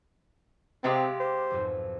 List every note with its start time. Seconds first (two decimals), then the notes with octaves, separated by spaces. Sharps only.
0.84 C3 G#3 C4 G4 F5 C6 E6
1.20 C5
1.51 B1 F2 G#2